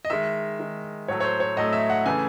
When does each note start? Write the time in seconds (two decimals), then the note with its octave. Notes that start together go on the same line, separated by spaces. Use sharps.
0.05 D#5
0.10 D#3 G#3 E5
0.60 D#3 G#3
1.08 A2 F#3 A3 C#5
1.20 C#5
1.24 C5
1.40 C#5
1.57 A2 F#3 A3 D#5
1.73 E5
1.90 F#5
2.06 C#3 E3 A3 G#5